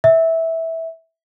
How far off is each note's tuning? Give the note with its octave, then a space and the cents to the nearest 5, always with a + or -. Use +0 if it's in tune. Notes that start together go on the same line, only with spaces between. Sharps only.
E5 -15